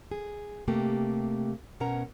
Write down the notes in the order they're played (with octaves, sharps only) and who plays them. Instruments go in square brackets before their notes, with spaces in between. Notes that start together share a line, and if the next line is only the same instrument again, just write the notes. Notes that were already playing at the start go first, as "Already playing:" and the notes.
[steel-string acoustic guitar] G#4
C3 A3 A#3 G4
B2 C#4 A#4 F#5 A#5